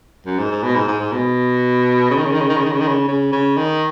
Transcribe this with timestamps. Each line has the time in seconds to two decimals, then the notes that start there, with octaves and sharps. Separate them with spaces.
0.26 F#2
0.39 G#2
0.51 G#2
0.63 B2
0.75 G#2
0.88 G#2
1.00 G#2
1.12 B2
2.10 C#3
2.18 D#3
2.26 C#3
2.34 D#3
2.41 C#3
2.49 D#3
2.57 C#3
2.65 D#3
2.73 C#3
2.81 D#3
2.88 C#3
3.08 C#3
3.32 C#3
3.57 D#3